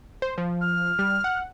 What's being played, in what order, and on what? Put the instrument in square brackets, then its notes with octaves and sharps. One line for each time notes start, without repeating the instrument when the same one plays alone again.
[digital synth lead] C5
F3
[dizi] F6
[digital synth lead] G3
F#5